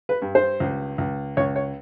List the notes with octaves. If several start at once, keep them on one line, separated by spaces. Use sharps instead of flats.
B4
G2
C5
C#2
C#2
C#2 C#5
C#5